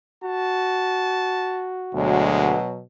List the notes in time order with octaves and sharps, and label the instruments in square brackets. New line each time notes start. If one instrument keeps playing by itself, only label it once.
[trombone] F#4 [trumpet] A5
[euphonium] D2 [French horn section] B2 F#3 [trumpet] G#3